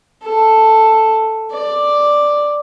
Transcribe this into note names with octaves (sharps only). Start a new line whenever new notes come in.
A4
D5